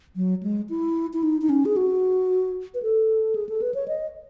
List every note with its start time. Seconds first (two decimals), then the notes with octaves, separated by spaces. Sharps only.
0.16 F#3
0.43 G#3
0.69 E4
1.13 E4
1.23 D#4
1.41 D#4
1.49 C#4
1.65 G#4
1.76 F#4
2.74 B4
2.83 A4
3.35 G#4
3.49 A4
3.62 B4
3.74 C#5
3.88 D#5